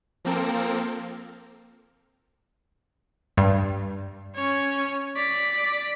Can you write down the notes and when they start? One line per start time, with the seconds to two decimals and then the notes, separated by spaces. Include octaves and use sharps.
0.25 F3 A#3 C4 A4 A#4
3.37 G2
4.35 C#4 C#5
5.16 D5 B6